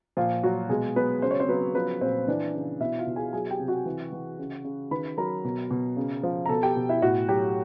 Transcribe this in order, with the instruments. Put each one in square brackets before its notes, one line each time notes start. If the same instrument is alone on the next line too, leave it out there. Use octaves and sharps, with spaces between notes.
[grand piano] A#2 F3 F4
F#3 F#4
B2 G#3 G#4
F#3 B3 B4
C#3 C5
C#5
C4 C5
F#3 B3 B4
F3 B3 B4
A#2 C4 C5
E3 D4 D5
C#3
B2 E4 E5
F4 F5
B2
G#4 G#5
F#3 G#4 G#5
G4 G5
C3
F#4 F#5
E3
E3
C#3
C#3
D#3 B4 B5
F#3 A#4 A#5
B2
B2
C#3
F3
A#5
B2 A4 A5
G4 G5
B2
E4 E5
A2 F#4 F#5
F#3 G4 G5